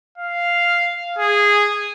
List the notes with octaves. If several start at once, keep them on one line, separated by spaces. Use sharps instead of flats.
F5
G#4